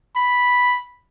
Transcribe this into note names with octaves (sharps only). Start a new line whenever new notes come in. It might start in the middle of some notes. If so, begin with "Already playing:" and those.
B5